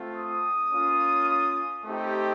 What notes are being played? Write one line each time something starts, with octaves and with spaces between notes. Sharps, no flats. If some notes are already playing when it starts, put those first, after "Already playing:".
Already playing: A3 C4 F4
D#6
A#3 C#4 F4
D#6
A3 C4 D#4 G4